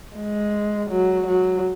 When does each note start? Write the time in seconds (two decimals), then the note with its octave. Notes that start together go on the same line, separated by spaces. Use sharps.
0.16 G#3
0.90 F#3
1.26 F#3